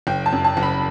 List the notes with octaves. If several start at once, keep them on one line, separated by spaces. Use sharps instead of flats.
F#1 G5
A5
F#2
A5
F#1
B5